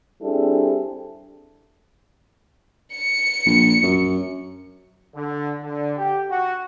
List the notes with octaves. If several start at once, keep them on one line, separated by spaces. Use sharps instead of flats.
G3 C4 D4 E4 G#4 A4
C#7
A#1
F#2
D3
D3
G4
F#4